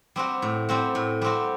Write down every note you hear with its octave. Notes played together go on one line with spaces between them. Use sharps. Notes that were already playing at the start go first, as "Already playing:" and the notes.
G3 C4 F#4
A2
G3 C4 F#4
A2
G3 C4 F#4